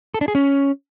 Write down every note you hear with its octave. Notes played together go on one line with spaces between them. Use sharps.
A4
D4
G#4
C#4